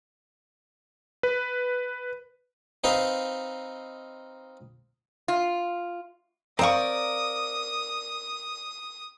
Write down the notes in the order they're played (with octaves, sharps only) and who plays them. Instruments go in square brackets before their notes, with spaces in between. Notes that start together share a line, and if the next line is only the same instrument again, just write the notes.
[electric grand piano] B4
[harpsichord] C4 D#4 B4 F5
[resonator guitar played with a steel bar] F4
[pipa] C4 C#6 [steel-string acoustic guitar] A#4 D5 [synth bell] F5 A#5 [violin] D#6